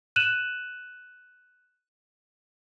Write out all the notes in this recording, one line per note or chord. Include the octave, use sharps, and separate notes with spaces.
F#6 D#7 E7 F#7